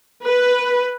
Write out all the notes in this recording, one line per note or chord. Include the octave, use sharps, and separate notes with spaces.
B4